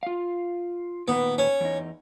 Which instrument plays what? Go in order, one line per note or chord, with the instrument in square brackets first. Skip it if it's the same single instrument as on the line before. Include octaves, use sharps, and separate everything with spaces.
[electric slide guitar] F4 F5
[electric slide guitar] A#2 D#3 B4 [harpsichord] B3
[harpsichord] C#4
[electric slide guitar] E2 D#4